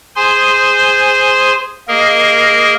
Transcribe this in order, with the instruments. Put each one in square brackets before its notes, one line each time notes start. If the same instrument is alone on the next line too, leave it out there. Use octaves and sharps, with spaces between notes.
[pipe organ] G#4 C5 G#5 C6
A#3 G#4 A#4 D#5